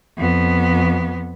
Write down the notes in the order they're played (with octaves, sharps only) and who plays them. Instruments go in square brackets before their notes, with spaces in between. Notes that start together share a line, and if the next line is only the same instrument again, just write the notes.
[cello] F2 B3